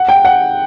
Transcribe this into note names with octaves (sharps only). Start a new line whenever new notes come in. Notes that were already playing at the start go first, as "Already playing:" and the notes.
Already playing: F#5
G5
F#5